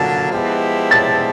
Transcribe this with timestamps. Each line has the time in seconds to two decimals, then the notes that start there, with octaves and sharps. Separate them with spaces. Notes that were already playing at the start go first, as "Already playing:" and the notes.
Already playing: D3 F#3 A#3 A6
0.32 F3 G#3 B3 E4 G4
0.91 A6